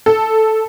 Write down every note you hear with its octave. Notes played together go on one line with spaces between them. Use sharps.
A4